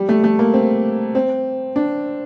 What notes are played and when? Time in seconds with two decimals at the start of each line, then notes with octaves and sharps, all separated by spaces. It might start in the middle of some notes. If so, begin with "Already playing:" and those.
Already playing: G3
0.09 A3
0.24 A3
0.39 A#3
0.54 C4
1.15 C4
1.76 D4